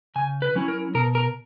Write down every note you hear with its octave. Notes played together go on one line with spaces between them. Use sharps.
C#3 G#5
B4
F#3 C#4 E4
A#4
B2 A#4
A#4